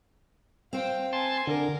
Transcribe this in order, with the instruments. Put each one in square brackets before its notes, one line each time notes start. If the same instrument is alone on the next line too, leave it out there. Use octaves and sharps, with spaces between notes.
[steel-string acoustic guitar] C4 C5 [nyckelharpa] F5 G5
[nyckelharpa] G#5 [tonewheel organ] A5 C6
[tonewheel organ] D3 [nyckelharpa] A#4